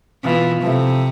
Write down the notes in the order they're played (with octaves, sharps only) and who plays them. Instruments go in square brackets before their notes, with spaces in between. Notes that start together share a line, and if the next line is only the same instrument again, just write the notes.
[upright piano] B2 B3 F4 [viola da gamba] E3
[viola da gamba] C3 [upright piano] F3 A3 E4